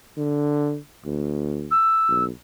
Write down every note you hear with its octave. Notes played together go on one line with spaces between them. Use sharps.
D3
D2
E6
B1